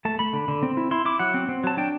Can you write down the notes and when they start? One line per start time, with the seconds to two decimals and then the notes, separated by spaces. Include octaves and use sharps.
0.05 A3 A5
0.19 A3 B5
0.33 D3
0.48 D3
0.63 C4
0.77 E4
0.91 E4 C6
1.05 E4 D6
1.19 F#3 F#5
1.34 C4
1.49 C4
1.64 F#3 A5
1.77 D4 G5